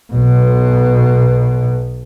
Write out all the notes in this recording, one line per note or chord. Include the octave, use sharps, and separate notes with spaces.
B1 B2